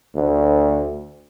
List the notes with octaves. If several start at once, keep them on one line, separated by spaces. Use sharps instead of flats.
D2